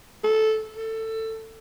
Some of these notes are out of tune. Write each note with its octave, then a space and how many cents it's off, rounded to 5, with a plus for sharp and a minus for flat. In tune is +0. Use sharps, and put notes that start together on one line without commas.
A4 -10
A4 +20